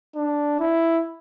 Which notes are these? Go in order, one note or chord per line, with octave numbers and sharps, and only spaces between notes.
D4
E4